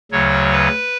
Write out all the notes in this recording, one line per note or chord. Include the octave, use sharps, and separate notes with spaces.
D2 C#3 F#3 C#5
B4